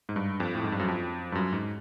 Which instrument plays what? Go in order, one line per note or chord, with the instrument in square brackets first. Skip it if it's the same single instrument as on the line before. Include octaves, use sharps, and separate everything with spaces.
[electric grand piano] G#2
G2
F2
A2
G#2
G2
F#2
F2
G2
F#2
G#2